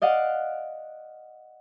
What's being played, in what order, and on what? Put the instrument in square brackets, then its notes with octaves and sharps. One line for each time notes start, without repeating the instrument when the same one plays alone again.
[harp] D5 D#5 F5 F#5